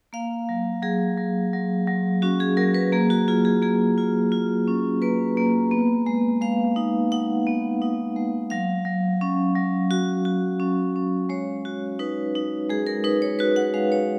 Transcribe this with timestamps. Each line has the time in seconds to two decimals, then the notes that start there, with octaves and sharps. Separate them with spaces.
0.13 A#3 F5
0.49 F#3
0.82 F#3 G#4
1.17 F#3
1.53 F#3
1.87 F#3
2.22 C#4 F#4
2.40 G#4
2.57 F#3 A#4
2.74 B4
2.92 A#3 G#4
3.10 F#4
3.28 F4 G#4
3.45 G#4
3.62 A#3 G#4
3.98 F4
4.32 F4
4.67 C#4
5.02 A#3 B4
5.37 A#3
5.71 B3
6.06 G#3
6.41 G#3 F5
6.76 D#4
7.12 D#4 F#5
7.47 B3
7.82 D#4
8.16 G#3
8.50 F#3 F5
8.85 F#3
9.21 C#4
9.56 F#3
9.91 F#4
10.25 F#4
10.60 C#4
10.96 C#4
11.29 G#3 C#5
11.65 F#4
11.99 D#4 B4
12.35 D#4
12.69 G#3 G#4
12.87 A#4
13.04 D#4 B4
13.22 C#5
13.39 F#4 B4
13.56 F#5
13.74 G#3 F5
13.92 C#5